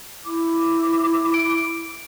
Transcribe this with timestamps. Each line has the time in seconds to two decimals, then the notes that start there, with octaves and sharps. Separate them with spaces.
0.25 E4 D6
1.34 D7